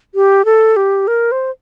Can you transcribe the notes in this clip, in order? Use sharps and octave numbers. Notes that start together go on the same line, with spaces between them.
G4
A4
G4
A#4
C5